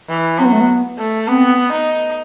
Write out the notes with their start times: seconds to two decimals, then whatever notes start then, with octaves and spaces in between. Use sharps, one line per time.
0.09 E3
0.39 F#3 C4
0.45 B3
0.53 A3
0.61 B3
0.98 A3
1.28 B3 C4
1.72 D#4